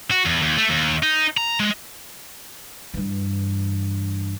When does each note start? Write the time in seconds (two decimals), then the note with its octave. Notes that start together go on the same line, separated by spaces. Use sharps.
0.11 F#4
0.25 E2
0.42 D#2
0.57 A3
0.70 D#2
1.03 D#4
1.37 A#5
1.60 G#3
2.94 G2 E3